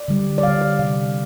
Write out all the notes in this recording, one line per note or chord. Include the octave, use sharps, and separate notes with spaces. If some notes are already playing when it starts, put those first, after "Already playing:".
Already playing: D5
D3 G3
D5
D3 G3 F5
D5
C3 G3 F5